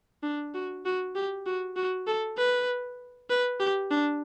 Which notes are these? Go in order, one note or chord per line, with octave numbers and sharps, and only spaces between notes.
D4
F#4
F#4
G4
F#4
F#4
A4
B4
B4
G4
D4